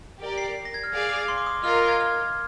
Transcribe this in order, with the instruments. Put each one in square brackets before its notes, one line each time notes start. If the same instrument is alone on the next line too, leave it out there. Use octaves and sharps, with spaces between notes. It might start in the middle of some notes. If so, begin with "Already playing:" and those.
[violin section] G4 A#4 D5
[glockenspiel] C7
A#6
G#6
F6
[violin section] G#4 D5 F5
[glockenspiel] D6
C6
D6
D#6
[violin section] F4 A#4 D#5 [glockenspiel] F6
[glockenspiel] G#6
F6